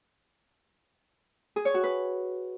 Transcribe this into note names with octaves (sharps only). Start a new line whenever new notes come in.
G#4
C#5
F#4
B4